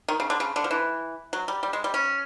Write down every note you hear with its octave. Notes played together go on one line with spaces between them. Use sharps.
D#3
C#3
D3
C#3
D3
F3
E3
F#3
G3
G3
G#3
G3
C#4